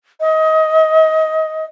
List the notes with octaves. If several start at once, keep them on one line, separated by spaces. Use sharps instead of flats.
D#5